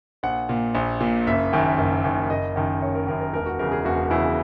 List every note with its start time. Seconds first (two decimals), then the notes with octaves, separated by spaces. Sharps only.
0.23 A#1 F#5
0.49 A#2
0.75 A#1
1.00 A#2
1.27 F#1 E5
1.53 F#2 D#3
1.78 F#1
2.04 F#2 D#3
2.30 F#1 D#5
2.56 F#2 D#3
2.82 F#1 C#5
2.95 A#4
3.07 F#2 D#3 A#4
3.21 A#4
3.33 E1 A#4
3.46 F#4
3.59 E2 C#3 A#4
3.72 G#4
3.84 E1 F#4
4.10 E2 C#3 E4